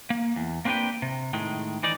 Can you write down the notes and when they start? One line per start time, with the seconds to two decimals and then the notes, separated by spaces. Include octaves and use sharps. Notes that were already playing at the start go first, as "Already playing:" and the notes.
0.10 A#3
0.36 E2
0.65 A#3 C4 D4 G4 B4 G5
1.02 C3
1.33 A2 D#3 G#3
1.83 E3 D#4 D5